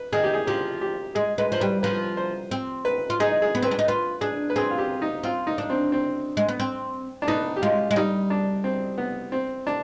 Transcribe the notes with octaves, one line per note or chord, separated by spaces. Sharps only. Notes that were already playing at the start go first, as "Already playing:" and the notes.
Already playing: B4
D#3 G#4
G4
G#4
F3 G4
G4
G#3 G#4
G#3 B4
F3 C5
G3 B4
F3 B4
C5
C4
B4
F4
D#4 G#4
G#4
B3
C4 B4
D4
D#4
F4 B4
D4 G#4
B4
C4 G#4
F4
G4
D#4
C4 F4
D#4
D4
C4
C4
G#3
B3
C4
D4
B3 D#4
G4
G#3 F4
G#3
G3 D#4
D4
C4
B3
C4
D4